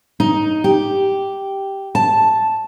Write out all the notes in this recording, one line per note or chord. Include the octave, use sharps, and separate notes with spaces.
D#4
G4
A5